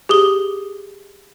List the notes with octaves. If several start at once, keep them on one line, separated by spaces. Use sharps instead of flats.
G4 G#4 D#6 G7